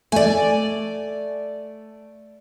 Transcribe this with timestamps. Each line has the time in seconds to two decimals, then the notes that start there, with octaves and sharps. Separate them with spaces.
0.12 A3 D5 G#5